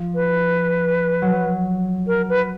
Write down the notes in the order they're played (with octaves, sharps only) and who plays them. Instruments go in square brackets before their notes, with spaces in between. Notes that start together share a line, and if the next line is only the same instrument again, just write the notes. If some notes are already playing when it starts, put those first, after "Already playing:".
Already playing: [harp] F3
[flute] B4
[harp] F#3
[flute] A#4
B4